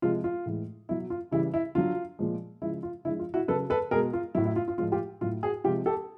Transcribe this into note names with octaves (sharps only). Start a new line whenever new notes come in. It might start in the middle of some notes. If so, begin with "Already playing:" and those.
C3 F3 G#3 F4
F4
A2 E3 G#3
B2 F#3 E4
F4
C#3 E3 G3 E4
E4
D3 F#3 F4
A#2 F3 G#3
C#3 F3 G#3 E4
F4
D3 F3 G#3 E4
F4
E4 F#4
C#3 F#3 A4 B4
A4 B4
B2 G#3 G#4 A#4
F4
A2 F#3 E4
E4
F4
F4
A2 F3 G#3 F4
F4 G4
A2 F#3 F4
F#4 G#4
C3 F3 G#3 F4 G4
G4 A4